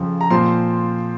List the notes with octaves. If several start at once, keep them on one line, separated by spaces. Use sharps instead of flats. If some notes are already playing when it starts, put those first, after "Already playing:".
Already playing: F2 C#3 F3
A#5
A#2 F3 C4 C6